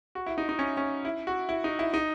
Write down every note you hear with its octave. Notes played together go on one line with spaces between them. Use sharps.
F#4
E4
D#4
D#4
C#4
C#4
E4
F#4
E4
D#4
E4
D#4